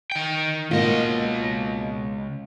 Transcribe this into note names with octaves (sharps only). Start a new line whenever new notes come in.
D#3 G5
C#2 B2 A#3 F4 D#5